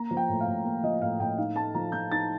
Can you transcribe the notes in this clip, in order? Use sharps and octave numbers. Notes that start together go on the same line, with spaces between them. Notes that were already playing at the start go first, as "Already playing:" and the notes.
Already playing: A#3 A#5
F3
G5
A2
F5
A2
A#3
F3 D#5
A2 F5
A2 G5
D#4 F5
A3 A5
F3 A#5
F3 G6
D#4 A6